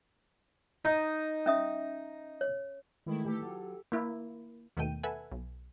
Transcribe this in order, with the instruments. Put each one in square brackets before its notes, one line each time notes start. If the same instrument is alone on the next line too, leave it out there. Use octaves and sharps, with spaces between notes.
[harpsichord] D#4
[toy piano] C#4 E5 D#6
C#5
[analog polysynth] D#3 E4 [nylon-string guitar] E3 G#3 A3
[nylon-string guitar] E3 A3 [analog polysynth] G4 A4
[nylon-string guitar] F#3 F4
[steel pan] A#3 E4
[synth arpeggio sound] D#2 B2 D#3 A3 G5 D#7
A4 B4 E5 F#5 G#5
B1